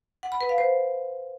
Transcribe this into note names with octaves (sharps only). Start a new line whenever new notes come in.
F#5
B5
B4
F5
C5